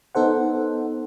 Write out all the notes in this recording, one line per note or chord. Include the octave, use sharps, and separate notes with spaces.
B3 D#4 A4 C5 F#5